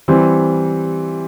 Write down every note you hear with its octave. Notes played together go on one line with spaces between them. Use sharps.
E3 G3 C4